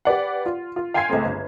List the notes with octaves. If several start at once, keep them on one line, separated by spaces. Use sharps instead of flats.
G4 B4 D5 F#5
F4
F4
F5 G5 G#5 C6 G#6 C7
C#2 A3 C4
G1